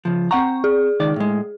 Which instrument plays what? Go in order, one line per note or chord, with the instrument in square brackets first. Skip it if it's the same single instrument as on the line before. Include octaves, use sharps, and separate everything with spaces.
[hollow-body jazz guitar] C#3 F3
[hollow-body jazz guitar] C4 F#5 A#5 [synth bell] C#6
[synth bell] G#4
[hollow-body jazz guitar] C#2 D#3 D5
A2 G#3